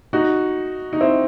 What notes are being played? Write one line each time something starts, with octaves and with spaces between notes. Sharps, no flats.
D#4 F#4
D#4
C4 E4